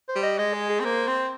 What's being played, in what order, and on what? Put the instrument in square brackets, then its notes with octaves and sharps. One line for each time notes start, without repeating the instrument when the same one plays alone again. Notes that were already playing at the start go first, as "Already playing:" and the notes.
[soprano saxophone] C5
[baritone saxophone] G3
[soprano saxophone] D#5
[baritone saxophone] G#3 [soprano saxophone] D#5
[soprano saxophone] G#4
G#4
[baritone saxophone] C4
[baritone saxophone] A#3 [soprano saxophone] C5
[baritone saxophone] C4